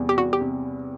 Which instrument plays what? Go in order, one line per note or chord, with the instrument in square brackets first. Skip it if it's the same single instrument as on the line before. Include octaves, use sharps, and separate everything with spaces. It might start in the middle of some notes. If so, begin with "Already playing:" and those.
Already playing: [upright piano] E2 C3 G3
[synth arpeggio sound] G4
[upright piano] E2 [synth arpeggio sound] F#4
[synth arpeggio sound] G4
[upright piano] C3